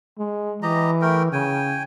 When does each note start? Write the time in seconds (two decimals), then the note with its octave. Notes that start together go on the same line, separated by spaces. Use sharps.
0.18 G#3
0.63 E3 G4 D#5 A#5
1.02 A3 A#4 G5
1.33 C#3 G5 G#5